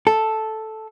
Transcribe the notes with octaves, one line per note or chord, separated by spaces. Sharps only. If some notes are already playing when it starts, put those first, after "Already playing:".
A4